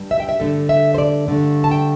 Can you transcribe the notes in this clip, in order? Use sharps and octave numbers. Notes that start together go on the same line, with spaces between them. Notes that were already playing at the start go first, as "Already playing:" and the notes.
Already playing: G2 G3
E5
G5
E5
G2 D3 A3 A4
E5
C5
D5
G2 D3 A3
A5
G5